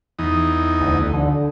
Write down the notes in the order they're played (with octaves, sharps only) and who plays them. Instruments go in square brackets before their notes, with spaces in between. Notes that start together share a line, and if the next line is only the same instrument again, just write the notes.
[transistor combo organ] E2 D#4
[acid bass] D2
D3